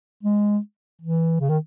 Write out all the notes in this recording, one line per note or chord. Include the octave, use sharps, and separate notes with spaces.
G#3
E3
C#3
D#3